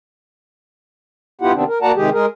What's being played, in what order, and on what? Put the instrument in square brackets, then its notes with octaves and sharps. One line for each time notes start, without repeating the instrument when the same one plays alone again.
[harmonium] G2 B3 E4 F4 G4 F#5
C3 D#3 B3 C4 D4
A#4
A#3 F#4 D5 F#5 A5 A#5
C3 D#3 G#3 G4 G#4
G#3 G#4 A#4